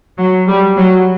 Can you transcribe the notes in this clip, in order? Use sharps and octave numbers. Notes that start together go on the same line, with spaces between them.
F#3
G3
F#3